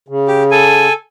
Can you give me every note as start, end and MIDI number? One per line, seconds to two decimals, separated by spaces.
0.08 0.88 49
0.28 0.43 67
0.51 0.93 69
0.51 0.93 80